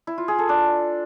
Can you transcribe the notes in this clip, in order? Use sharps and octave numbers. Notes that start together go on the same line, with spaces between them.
E4
F4
G#4
A4
D4